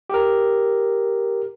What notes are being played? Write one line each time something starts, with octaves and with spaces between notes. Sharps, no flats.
G4 A#4